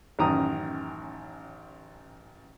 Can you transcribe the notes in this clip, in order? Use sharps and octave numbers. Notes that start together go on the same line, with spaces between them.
A1 F#2 D#3 A#5 D#6